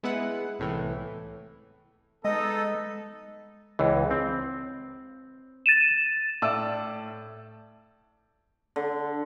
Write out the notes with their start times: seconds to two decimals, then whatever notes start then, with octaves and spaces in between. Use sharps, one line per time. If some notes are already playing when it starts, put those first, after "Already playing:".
0.03 G#3 B3 E4 B4 F#5
0.59 C2 A2 E3
2.25 G#3 B3 D#4 A4 D#5
3.79 C#2 E3
4.11 C4
5.66 A6 D#7 E7
6.42 A2 D5 A5 E6
8.76 D3